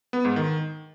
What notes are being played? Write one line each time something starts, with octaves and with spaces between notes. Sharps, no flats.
B3
G#2
D#3